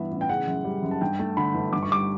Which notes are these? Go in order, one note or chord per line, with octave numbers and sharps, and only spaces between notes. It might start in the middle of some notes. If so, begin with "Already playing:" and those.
Already playing: G2 E3 B3 E5
A1
G5
C#3 F#5
F#2
G3
F#2
A5
G2 G5
A3 A5
D3 B5
G1
G2 D6
C#6
G3 D6